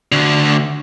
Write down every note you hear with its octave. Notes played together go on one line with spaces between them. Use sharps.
D2 D3